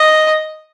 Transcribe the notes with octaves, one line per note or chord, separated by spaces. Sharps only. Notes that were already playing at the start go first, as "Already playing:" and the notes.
Already playing: D#5